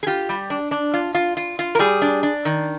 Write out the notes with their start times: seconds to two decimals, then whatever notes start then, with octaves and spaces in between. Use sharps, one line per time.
0.03 G#4
0.07 F4 G4
0.29 G3
0.50 D4
0.71 D4
0.94 F4
1.15 F4
1.37 F4
1.59 F4
1.75 A#4
1.79 G3 G#4
2.02 D4
2.23 D4
2.45 D#3